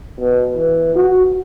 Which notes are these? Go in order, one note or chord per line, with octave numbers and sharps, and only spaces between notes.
B2
E3
F#4